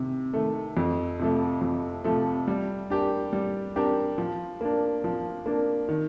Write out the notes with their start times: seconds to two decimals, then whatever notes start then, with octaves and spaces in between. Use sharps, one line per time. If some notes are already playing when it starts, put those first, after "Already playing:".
Already playing: C3 D#3
0.34 D#3 A3
0.77 F2
1.19 C3 F3 A3
1.61 F2
2.04 C3 F3 A3
2.48 G3
2.90 D4 G4 A#4
3.33 G3
3.76 D4 G4 A#4
4.18 F3
4.61 A#3 D4
5.04 F3
5.46 A#3 D4
5.89 D#3